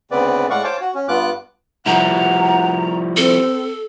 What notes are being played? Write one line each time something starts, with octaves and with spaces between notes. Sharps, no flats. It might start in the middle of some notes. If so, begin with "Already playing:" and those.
D2 C#3 B3 C4 B4 D5
A2 G#3 D5 F5 F#5 C#6
C5 C#5 F5 G5 A5 D6
F#4
C#4
G2 B3 F4 D6 F#6
F3 G3 E4 F#5 A#5
C4 A4